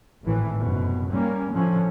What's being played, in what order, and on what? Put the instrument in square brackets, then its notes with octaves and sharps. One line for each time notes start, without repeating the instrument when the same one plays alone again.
[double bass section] G#1 A2 E3
F1 F#2 B2
G3 A#3 C#4
A2 D3 F3 C#4